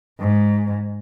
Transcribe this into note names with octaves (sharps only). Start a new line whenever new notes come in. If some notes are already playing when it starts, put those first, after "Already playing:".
G#2